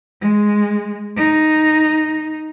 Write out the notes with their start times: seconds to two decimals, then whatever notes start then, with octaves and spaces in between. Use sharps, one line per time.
0.21 G#3
1.16 D#4